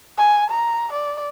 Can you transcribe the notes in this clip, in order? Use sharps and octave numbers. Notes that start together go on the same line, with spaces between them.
G#5
A#5
D5